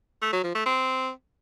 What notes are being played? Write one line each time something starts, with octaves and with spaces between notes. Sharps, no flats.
A3
F#3
F3
A3
C4